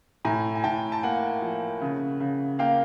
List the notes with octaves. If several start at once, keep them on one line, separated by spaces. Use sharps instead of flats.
A2 G#5 A#5
G#5
A2 G5 A5
A5
A#3 F#5 G#5
F3
C#3
C#3
A#3 F5 G5